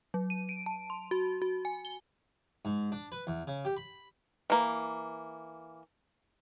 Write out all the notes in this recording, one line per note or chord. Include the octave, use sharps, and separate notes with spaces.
F#3
D#7
D7
A5
C6
F#4
F#4
G#5
G7
G#2
D4
B4
E2
C#3
G4
B5
E3 A#3